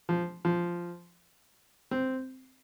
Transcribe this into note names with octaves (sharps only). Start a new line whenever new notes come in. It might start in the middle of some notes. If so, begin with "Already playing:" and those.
F3
F3
C4